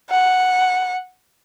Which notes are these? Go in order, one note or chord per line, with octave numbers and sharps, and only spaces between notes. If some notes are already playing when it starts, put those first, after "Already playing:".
F#5